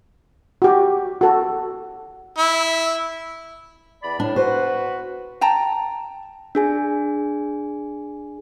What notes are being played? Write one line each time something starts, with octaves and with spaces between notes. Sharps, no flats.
F#4 G4
F#4 A4
E4
E2 D5 B5
A2 D4
F#4 B4 C5
G5 A5 A#5
D4 G#4 G#5